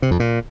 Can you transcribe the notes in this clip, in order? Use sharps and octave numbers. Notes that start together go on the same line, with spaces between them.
C3
F2
A#2